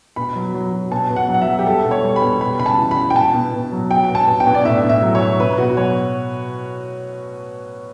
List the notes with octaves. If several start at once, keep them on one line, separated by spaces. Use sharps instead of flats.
B2 B5
F#3
F#3
F#3
B2 A5
B2
F#5
F#3
F#5
E5
F#3
G4
G3 A4
B2
C#5
G3
B5
B2
G3 B5
C#3 B5
A5
E3
B5
E3
G5
B2 A5
B2
B2
F#3
F#3 G5
B2
A5
B2
G5
B2
D5
A2 E5
A2
E5
F#3
C#5
F#3
B2 B4
B2 F#4
F#3 C#5